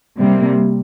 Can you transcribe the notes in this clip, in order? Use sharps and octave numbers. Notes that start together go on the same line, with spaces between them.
C3 G3 A#3